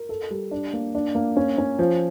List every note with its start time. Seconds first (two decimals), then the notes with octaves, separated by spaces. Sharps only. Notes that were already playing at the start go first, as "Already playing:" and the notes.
Already playing: A#4
0.09 A4
0.30 G3
0.51 D4
0.73 A#3
0.95 D4
1.15 A#3
1.37 C#4
1.58 C#4
1.79 F3